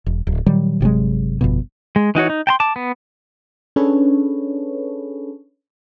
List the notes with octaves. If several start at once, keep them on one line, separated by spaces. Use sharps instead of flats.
E1
D1
A#2 D#3 F#3 G3
G1 C3 F#3 G#3
G1 F2 B2
G#3
E3 D#4 F#4 C#5
D#4
G5 A5 C6
A5 D6
B3
C#4 D4 G#4 A4 B4 C#5